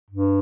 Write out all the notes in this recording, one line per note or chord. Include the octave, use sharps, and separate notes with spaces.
G2